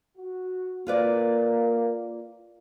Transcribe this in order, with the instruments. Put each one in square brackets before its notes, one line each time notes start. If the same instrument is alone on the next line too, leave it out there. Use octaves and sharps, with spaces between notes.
[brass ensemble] F#4
[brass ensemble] A#3 [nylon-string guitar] F4 B4 D5